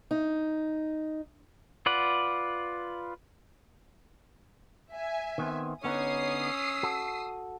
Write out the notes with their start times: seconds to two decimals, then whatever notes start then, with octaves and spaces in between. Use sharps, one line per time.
0.11 D#4
1.86 F4 B4 D5 F#5
4.92 E5 G#5
5.38 D#3 B3 C4
5.84 D3 B3 C#4 D#4 C#5 D#6 C7
6.44 E6
6.83 F#4 A4